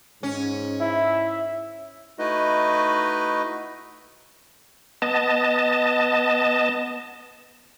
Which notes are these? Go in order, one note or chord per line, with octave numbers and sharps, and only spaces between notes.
G#2 C#4
E4 E5
A3 D#4 E4 F#4 B4 D#5
B3 D#5 A5